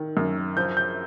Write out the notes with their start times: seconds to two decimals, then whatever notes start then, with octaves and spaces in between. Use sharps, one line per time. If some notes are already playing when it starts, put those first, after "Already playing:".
Already playing: D#3
0.17 F#2
0.57 F3 G6
0.77 G6